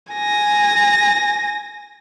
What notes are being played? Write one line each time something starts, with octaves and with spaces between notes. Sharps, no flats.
G#5 A#6